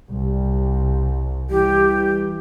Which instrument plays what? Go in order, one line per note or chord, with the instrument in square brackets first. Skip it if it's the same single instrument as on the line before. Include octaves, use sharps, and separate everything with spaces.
[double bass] C2 [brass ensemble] G3
[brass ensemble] E3 G3 [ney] G4